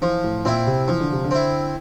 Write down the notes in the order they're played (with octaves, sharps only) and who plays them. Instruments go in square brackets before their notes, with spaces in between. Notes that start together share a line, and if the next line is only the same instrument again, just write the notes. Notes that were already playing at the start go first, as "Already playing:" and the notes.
[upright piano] E3 [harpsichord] F3
[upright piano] A2
[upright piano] A#2 [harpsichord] C4 E4
[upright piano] C3
[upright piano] E3 [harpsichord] F3
[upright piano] D3
C3
D3
[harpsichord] C4 E4